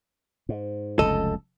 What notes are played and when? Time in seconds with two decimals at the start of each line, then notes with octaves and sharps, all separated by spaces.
0.49 G#2
0.99 F1 C#2 F#2 A4 D#5